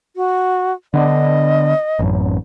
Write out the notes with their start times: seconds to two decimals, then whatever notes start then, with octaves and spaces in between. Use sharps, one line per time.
0.16 F#4
0.94 D3 B3 D4 D#5
1.99 A1 F#2